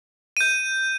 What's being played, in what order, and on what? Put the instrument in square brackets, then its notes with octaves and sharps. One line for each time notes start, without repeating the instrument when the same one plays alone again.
[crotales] G6 D#7